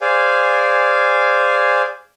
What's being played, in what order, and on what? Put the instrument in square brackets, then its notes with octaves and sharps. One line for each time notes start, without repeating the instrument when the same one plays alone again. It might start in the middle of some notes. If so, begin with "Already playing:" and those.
[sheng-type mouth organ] G#4 C5 D5 F5 G#5